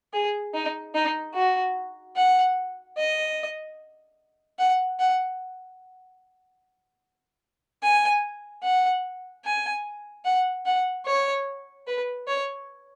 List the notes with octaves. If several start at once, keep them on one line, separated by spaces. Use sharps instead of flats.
G#4
D#4
D#4
F#4
F#5
D#5
F#5
F#5
G#5
F#5
G#5
F#5
F#5
C#5
B4
C#5